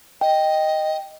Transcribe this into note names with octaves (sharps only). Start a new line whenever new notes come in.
D#5 G5